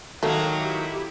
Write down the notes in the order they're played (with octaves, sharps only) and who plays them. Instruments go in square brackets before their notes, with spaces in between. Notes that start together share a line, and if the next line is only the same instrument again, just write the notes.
[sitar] D#3 F#3 A#3 [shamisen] A3 [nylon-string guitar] F#4 A#4
[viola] E4 G4